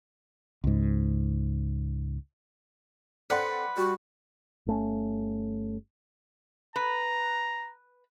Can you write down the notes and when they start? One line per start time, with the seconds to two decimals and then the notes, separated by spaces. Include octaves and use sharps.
0.64 C#2 G#2
3.30 C4 A4 B4 D5 F#5 C6
3.77 G3 F#4
4.66 G1 A3 C#4
6.76 B4 A#5